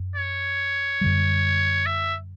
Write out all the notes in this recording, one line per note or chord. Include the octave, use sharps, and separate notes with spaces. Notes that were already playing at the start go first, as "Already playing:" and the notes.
Already playing: F#2
C#5
F#2 D3 G3
E5